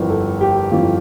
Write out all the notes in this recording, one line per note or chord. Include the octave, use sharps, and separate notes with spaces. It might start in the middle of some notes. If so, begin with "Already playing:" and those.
Already playing: G1 F2 E3 A#4
A4
G4
G1 F2 E3 F4